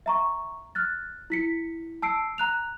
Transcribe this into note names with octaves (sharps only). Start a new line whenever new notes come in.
E5 A#5 C#6
F6 F#6 A6
E4 B6 C#7
A5 E6 C7 D7
A#5 F#6 F7